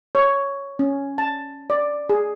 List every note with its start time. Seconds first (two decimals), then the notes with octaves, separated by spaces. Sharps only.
0.15 C#5
0.79 C#4
1.18 A5
1.70 D5
2.09 G#4